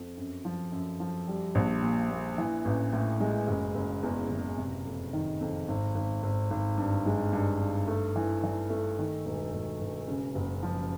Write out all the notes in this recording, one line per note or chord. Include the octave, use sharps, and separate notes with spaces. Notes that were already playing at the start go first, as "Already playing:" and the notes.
Already playing: F2
F#2
F3
F#2
F3
G3
A#1
A#2
A#2
E3
A1
A2
G#3
F#1
F#1
E2
F#1
C3
F2
D#3
F2
G#1
G#1
G#1
G#1
G2
G#3
G2
G2
A3
E3
E3
A3
D#3
E1
E1
E1
C#3
F#1
F3